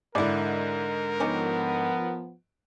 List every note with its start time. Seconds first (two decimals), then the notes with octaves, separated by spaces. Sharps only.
0.15 G#2 D3 E4 A#4 D5
1.20 D#3 F3 B3 C#4 G4